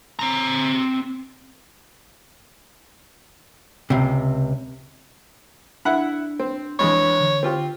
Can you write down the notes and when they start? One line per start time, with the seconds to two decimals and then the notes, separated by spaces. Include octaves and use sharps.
0.19 C4 A#5
3.90 C#2 C3
5.85 D4 E4 F#5 B5
6.39 C4
6.79 F2 E3 G#3 D4 C#5 B5
7.21 D3
7.43 C4 F4 G4